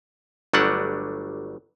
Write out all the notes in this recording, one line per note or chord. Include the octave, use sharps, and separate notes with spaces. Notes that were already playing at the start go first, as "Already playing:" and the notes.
G1 F#3 G3 A3 D4 F#5